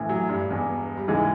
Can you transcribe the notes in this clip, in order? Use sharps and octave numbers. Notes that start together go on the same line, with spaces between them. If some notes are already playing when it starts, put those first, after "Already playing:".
Already playing: A#1 A2 E3
F#3
G2 G3
E1 E2 B2
G3
D#2 G#2 C#3 E3 G#3